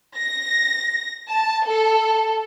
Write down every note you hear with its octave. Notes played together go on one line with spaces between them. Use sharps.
A#6
A5
A4